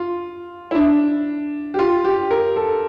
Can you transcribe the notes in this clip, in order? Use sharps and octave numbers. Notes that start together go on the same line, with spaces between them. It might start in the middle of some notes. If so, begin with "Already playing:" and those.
Already playing: F4
E4
D4
G4
F4
G4
A#4
A4